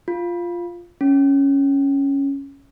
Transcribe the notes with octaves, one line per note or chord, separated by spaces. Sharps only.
F4
C#4